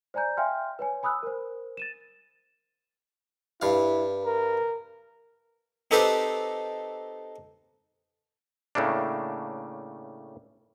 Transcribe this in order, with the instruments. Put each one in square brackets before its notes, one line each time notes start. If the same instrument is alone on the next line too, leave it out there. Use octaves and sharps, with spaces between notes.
[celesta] C5 D5 G#5 A#5 G6
E5 F5 G5 G#5 C6 F6
B4 C#5 G#5
G#5 B5 D#6 E6 F#6
A#4 C5
A6 D#7 E7
[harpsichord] G2 F5 [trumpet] E4
[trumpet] A#4
[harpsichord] C4 D#4 G4 A4 B4 C5
[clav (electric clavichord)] A2 C#3 A3 A#3 D4